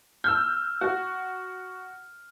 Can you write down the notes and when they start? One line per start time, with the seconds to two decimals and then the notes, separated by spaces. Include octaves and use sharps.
0.24 E6 F6 G6
0.81 F#4